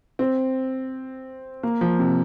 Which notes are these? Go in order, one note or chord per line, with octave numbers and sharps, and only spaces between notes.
C4
A#3
F3
C3